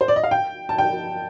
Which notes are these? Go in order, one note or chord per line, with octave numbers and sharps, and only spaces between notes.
C5
D5
D#5
F5
G5
A5
G5